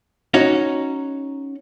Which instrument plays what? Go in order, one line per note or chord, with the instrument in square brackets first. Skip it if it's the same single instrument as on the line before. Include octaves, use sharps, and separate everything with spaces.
[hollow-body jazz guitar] C#4 D#4 F#4